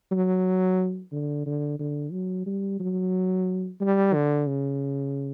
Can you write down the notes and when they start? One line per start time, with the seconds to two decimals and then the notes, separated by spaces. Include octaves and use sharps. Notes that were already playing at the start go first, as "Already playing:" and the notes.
0.11 F#3
1.12 D3
1.46 D3
1.79 D3
2.12 F#3
2.46 G3
2.80 F#3
3.81 G3
4.14 D3
4.47 C#3